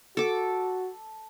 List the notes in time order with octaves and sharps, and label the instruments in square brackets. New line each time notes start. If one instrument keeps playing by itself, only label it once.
[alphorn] F#4 [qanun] A4 D6